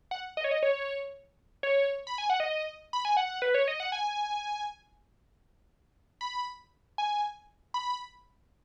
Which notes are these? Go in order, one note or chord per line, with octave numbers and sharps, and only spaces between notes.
F#5
D#5
C#5
D#5
C#5
C#5
B5
G#5
F#5
D#5
B5
G#5
F#5
B4
C#5
D#5
F#5
G#5
B5
G#5
B5